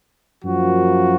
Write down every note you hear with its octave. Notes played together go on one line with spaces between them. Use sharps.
F#2 F3 A#3 F#4